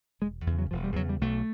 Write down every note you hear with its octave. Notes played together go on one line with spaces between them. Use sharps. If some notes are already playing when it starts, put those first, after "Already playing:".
E1 G#3
E2 C#3
F#3
E1 F3
G3
E2 C#3 F#3
G3
B1 A3